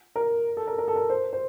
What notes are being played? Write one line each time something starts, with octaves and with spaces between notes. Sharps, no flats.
A#4
A4
A#4
A#4
A4
A#4
C5
C5